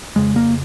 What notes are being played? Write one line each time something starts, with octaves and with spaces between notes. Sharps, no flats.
F2 C#3 G#3
A#3